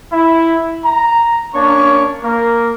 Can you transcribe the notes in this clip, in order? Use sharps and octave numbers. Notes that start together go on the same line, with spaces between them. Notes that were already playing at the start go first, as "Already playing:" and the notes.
E4
A#5
A#3 C#4 D4 C#5 D5 C#6
A#3 A#4